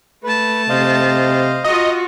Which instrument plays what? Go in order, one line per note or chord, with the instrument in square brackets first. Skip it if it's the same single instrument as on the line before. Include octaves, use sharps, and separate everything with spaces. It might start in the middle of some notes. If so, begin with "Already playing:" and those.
[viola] A3 A5 [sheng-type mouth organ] B4
[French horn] C3 [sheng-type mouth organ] C5 D#5 F5
[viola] F4 F#4 [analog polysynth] D#5 [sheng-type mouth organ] A#5